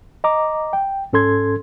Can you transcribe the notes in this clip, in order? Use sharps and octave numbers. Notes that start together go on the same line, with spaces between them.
D#5 A#5 D6
G5
G#2 C#4 A4 C6 G#6